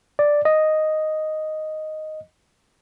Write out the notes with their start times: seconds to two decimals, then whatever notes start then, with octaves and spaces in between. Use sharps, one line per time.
0.19 D5
0.45 D#5